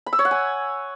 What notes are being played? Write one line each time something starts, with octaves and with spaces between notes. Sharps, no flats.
B5
E6
C#5
F#5
G#5